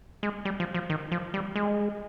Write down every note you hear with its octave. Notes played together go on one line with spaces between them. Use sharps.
G#3
G3
F3
F3
D#3
F3
G3
G#3